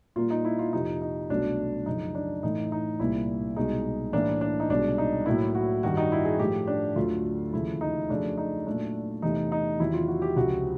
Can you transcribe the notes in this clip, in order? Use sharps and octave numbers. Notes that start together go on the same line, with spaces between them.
A#2 G3 A#3 F4
D#4
E4
F4
F2 C3 F3 D#4
D#4
C2 B2 F#3 A3 D4
F#2 C#3 F3 D#4
D4
A2 E3 A3 D#4
D#4
C2 A#2 G3 A#3 E4
C2 B2 G#3 D#4
A2 E3 G3 A#3 D4
D4
D#4
C2 B2 G#3 D4
D#4
A2 F#3 A#3 E4
F#4
G2 D#3 G3 F#4
D#4
E4
G#4
A2 F3 A3 G4
D4
D2 D3 F#3 A3 F4
D#2 C#3 F3 A3 E4
D#4
F2 C#3 F#3 A3 D4
D#4
A#2 F#3 A3 D4
E2 C3 E3 A3 D#4
D#4
E2 C3 D#3 F#3 E4
F4
F#4
G4
C#2 C3 F3 F#4